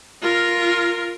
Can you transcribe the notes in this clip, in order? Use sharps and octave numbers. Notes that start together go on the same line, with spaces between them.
F4 A#4